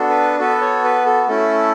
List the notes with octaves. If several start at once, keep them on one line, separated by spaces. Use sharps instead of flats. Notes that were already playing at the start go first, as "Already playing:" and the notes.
Already playing: B3 D4 F#4 A4
B4
B3 F#4 A4 B4
C#5
B4
A4
A3 C#4 E4 A4